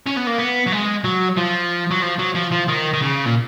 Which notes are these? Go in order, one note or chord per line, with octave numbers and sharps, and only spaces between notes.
C#4
B3
A#3
B3
F#3
G#3
F#3
F3
F#3
F3
F#3
F3
F3
D#3
D#3
C#3
A#2